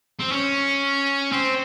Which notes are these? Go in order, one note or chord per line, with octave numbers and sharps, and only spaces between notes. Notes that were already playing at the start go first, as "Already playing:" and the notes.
C4
C#4
C4